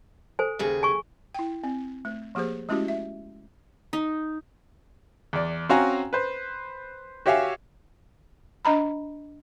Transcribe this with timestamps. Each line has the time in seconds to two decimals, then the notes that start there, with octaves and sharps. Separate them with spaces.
0.39 A4 C5 G#5
0.59 D#2 C#3 G#4
0.83 G#5 C#6
1.35 E4 G5
1.64 C4
2.05 A3
2.35 F3 A#3 G4 G#4 C5
2.69 G#3 A3 C#4 E4 F#4 G4
2.88 E5
3.93 D#4
5.33 E2 D5
5.69 C4 C#4 F#4 F5 G#5 A#5
6.13 B4 C5
7.26 F#4 G4 C#5 E5 F5 G#5
8.65 D4 D#5 A#5 B5